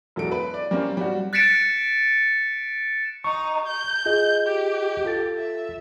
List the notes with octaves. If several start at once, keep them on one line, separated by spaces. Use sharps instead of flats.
E1 F#3 A4 D7
B4
D5
G3 A#3 C4 C#4
G3 F#4
F#6 A6 B6 C#7 D7 E7
D#4 C#6
G6
F4 G#4 D#5
G4
F4 A4 A6
E5